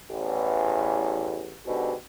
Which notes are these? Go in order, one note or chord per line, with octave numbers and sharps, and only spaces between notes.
A1 E2
G#2 B2 D3 G4